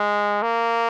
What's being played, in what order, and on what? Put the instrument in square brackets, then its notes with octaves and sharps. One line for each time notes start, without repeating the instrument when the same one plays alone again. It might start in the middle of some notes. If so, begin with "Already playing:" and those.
Already playing: [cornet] G#3
A#3